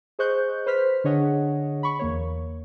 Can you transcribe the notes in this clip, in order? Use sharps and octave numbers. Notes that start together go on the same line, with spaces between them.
G#4 C5 D#5 C#6 F#6 G6
B4 C5 C6 F6 B6
D3 D4 G#4 C#5 D#5 F#5
B5 C#6
E2 A#3 C#5